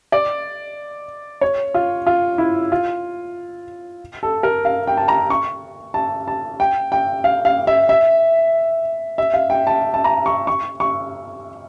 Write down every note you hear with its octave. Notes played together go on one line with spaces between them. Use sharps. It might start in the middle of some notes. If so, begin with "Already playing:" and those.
D5
C#5
F4
F4
E4
F4
A4
A#4
F5
G5
A5
A#5
C#6
A5
A5
G5
G5
F5
F5
E5
E5
E5
F5
G5
A5
A5
A#5
C#6
C#6
C#6